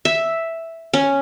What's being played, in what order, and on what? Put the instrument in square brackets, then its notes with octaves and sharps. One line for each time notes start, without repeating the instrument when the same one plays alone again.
[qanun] E5
C#4